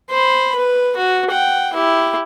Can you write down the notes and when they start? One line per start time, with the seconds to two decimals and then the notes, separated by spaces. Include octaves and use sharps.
0.10 C5 B5
0.56 B4
0.96 F#4
1.31 F#5 G5
1.73 E4 G4